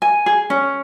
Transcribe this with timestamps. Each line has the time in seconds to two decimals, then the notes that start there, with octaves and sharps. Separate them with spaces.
0.02 G#5
0.26 G#4
0.50 C#4